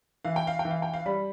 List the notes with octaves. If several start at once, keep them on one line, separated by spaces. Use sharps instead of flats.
E3 F5
G5
F5
G5
E3
F5
G5
F5
G3 B5